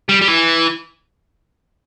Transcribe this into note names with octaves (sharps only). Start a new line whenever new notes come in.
G3
G3
E3